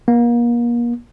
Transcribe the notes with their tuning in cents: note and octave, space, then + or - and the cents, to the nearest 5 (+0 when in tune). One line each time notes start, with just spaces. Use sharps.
A#3 +35